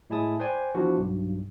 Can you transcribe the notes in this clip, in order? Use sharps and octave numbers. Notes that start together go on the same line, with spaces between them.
A2 G#3 E4 G#5 A5 D#6
B4 C5 D5 G5 G#5
E3 F3 B3 D4 F#4
B1 G2